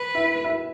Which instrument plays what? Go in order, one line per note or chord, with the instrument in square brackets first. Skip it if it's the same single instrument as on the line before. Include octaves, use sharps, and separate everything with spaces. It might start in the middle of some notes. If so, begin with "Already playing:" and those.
Already playing: [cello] B4
[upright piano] E4 E5
E4 E5